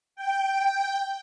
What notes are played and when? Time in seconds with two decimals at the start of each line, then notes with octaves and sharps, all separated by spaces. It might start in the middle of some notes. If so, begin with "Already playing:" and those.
0.16 G5